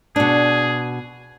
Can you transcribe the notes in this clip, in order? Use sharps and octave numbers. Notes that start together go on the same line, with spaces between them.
B2 D4 G#4